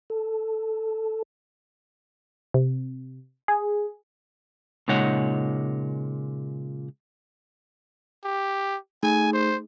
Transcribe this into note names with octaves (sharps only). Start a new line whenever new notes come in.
A4
C3
G#4
A#2 C#3 G#3 D#4 C#5 F#5
G4
A3 D#4 G#4 G#5
C5